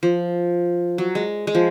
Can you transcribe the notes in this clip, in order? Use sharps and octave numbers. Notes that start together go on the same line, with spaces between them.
F3
F#3
G#3
G#3
F3